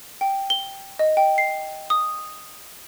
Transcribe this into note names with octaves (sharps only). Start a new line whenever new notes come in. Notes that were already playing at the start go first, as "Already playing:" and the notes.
G5
G7
D#5
G5
C7
D#6